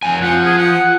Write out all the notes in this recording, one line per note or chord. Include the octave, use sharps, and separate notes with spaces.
F2 G#5
F3 F#5
G#4
F#5